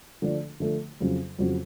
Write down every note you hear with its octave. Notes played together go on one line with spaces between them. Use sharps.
D3 F3 A3 D4
D3 F3 A3 D4
F2 C#3 F#3
F2 C#3 F#3